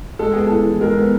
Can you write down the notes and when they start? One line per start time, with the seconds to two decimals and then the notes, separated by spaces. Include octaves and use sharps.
0.19 G#3 A4
0.33 B3 G#4
0.47 A2 A4
0.66 E3
0.81 G#3 A#4
0.97 B3